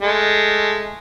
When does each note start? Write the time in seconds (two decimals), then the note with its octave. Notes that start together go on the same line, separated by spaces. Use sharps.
0.01 G#3 A3